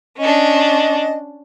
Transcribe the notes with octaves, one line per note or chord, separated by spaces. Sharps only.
C#4 D4 D#5